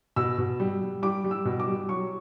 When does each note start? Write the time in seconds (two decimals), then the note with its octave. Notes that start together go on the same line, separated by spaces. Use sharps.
0.16 B2 E6
0.38 B2
0.60 G3
0.82 G3
1.03 G3 D6
1.24 G3
1.31 E6
1.45 B2
1.60 D6
1.68 G3
1.89 F#3 C#6